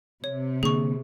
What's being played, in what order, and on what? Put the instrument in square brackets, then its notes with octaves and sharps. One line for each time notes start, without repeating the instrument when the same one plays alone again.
[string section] C3 [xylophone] C#5
[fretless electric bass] D3 A#3 D4 [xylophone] G#4 C#6